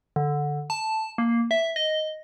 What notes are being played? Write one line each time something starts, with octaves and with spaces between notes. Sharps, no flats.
D3
A5
A#3
E5
D#5